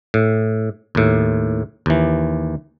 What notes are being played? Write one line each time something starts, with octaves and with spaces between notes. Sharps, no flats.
A2
D#2 A2
D#2 E3